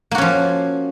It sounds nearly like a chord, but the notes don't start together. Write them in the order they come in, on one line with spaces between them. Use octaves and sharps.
A#3 F#4 C#4 F3